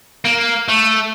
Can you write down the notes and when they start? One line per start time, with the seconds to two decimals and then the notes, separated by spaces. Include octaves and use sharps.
0.25 A#3
0.68 A3